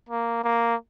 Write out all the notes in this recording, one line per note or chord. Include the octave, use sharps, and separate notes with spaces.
A#3
A#3